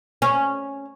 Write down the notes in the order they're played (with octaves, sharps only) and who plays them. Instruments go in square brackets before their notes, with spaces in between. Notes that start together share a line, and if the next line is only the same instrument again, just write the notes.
[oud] C#4